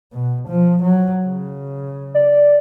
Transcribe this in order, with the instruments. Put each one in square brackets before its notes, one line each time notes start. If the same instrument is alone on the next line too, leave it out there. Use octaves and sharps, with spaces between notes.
[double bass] B2
F3
F#3
C#3
[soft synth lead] D5